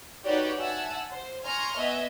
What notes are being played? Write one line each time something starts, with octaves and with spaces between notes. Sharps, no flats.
D#4 F#4 G4 B4 C#5 D5
E5 F#5 G#5 A5 E6
C5
G#5 A#5 C6 C#6 F6
B3 D#5 E5 G#5